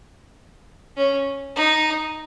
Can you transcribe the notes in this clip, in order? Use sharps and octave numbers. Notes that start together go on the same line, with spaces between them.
C#4
D#4